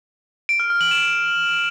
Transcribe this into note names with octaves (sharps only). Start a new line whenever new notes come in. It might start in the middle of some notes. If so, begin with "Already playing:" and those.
D7
F6
F6
F#7
E7